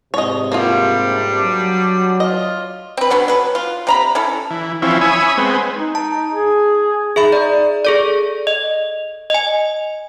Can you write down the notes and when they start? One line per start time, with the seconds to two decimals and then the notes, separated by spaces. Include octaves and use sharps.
0.14 G#2 C3 C#5 D#5
0.52 G3 A#3 B3 D4 F4
1.44 F#3
2.20 F4 D#5
2.97 C4 B4
3.10 D3 F#3 B3 C#4
3.28 F#3 B4
3.55 F4
3.87 C3 A#5 B5
4.15 C#4 E4 A4
4.50 E3
4.82 E3 F3 C4 C#4 E4
5.01 C#5 E5 G#5 B5 D#6
5.37 G#3 B3 C4
5.77 D#4
5.95 A5
6.33 G#4
7.16 D#4 G#4 E5 B5
7.33 D5
7.85 G#4 A4 D5
8.47 D#5
9.30 D#5 G#5